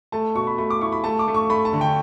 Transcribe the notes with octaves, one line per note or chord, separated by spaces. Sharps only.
A3 A5
B2 C#6
B5
A3 B5
D6
E4 C#6
B5
A3 A5
D6
A3
C#6
A3 B5
A5
D3
G5